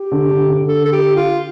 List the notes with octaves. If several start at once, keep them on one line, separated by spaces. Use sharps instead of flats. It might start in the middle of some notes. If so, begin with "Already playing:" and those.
Already playing: G4
D3
D3
D3
A4
A4
G4
F4